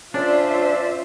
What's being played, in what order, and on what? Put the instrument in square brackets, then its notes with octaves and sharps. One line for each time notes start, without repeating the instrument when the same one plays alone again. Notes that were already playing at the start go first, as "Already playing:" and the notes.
[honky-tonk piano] C#4 [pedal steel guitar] D4 [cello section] F4 C5 E5 [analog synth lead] D5